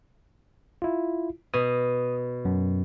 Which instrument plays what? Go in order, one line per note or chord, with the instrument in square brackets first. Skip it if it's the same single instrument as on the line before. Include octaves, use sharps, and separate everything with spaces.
[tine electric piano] E4 F4
[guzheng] B2 [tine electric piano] D#6
[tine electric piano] F#2